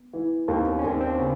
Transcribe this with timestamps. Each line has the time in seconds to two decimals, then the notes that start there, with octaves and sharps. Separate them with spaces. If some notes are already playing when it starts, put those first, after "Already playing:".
Already playing: B3
0.13 E3
0.48 D#2 A#3 C4
0.66 B3 C#4
0.79 C#4
0.83 D#2 C4 D4
1.01 C4 D4
1.18 C#3 B3 C#4